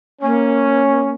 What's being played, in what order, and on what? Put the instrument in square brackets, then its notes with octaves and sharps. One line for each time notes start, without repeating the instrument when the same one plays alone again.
[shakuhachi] A#3 [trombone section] C#4